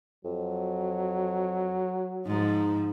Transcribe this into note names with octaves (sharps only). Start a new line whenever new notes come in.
F2 F#3
G#2 F3 D#4